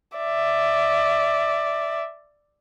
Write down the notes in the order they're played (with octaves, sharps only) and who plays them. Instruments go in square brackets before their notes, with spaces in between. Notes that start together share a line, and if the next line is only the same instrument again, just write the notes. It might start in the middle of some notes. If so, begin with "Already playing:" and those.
[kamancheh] D5 E5